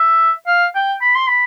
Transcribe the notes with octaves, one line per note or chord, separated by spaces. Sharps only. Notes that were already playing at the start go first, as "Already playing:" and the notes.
Already playing: E5
F5
G5
B5
C6
B5